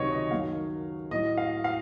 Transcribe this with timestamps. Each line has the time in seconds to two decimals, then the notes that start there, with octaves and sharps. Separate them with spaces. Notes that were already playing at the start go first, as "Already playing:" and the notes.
Already playing: C#2 C3 D#3 F#3 C#5 D#5
0.12 D#5
0.31 F#2 D#3 F#3 F5
1.11 A2 F#3 D#5
1.37 F5
1.64 F5